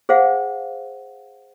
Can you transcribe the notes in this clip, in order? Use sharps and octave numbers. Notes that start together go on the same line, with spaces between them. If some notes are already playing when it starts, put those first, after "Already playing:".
G#4 C5 F5 F#5